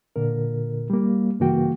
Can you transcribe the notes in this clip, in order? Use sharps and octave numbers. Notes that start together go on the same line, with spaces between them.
A#2 D3 A#4
G3 A#3
G2 C#3 E3 A#3 F#4 G5